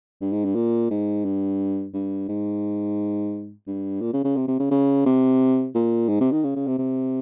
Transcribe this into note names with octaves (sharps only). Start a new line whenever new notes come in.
G2
G#2
G2
A#2
G#2
G2
G2
G#2
G2
A#2
C#3
C#3
C3
C3
C#3
C#3
C3
A#2
G#2
C3
D#3
C#3
C#3
C3
C3